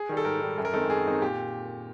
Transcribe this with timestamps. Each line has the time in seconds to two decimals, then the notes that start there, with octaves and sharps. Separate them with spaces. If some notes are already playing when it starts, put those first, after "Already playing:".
Already playing: G#4
0.09 D#3 G3
0.17 A4
0.25 G#2 A#4
0.41 D#3 G3
0.58 F#2 A4
0.65 A#4
0.73 D#3 G#3 C4 D#4 A4
0.90 F#2 G#4
1.06 D#3 G#3 C4 D#4
1.22 A#2 G4